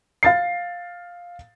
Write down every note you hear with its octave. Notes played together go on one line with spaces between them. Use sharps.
F5 A6 C7